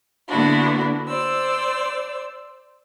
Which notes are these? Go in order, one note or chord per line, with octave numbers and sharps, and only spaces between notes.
D3 A#3 B3 D4 E4 F#4
C5 D5 E6